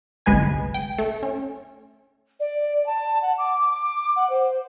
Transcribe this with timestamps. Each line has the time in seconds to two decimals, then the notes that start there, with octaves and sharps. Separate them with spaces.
0.26 G1 C2 G#3 B4 G#5 G#6
0.74 G5
0.98 A3
1.23 C#4
2.40 D5
2.86 A5
3.22 F#5
3.38 D6
3.70 D6
4.16 F#5
4.30 C5